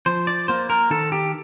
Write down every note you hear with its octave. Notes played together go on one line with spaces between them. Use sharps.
F3 C5
D5
A#3 C5
A#4
D#3 A4
G4